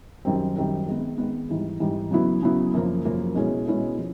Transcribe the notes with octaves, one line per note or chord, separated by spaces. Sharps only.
F#2 D#3 G3 C4
F#2 D#3 G3 C4
D#3 G#3 B3
D#3 G#3 B3
G#2 E3 G3
G#2 E3 G3
C#3 F#3 B3 E4
C#3 F#3 B3 E4
F#2 C#3 F3 A#3
F#2 C#3 F3 A#3
B2 G#3 C#4 E4 G#4
B2 G#3 C#4 E4 G#4
F3 C#4